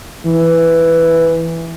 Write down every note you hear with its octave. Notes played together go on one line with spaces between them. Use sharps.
E3